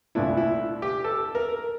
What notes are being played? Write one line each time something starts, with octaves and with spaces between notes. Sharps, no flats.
C2 A#2 A3 D4 E4
E4
G4
A4
A#4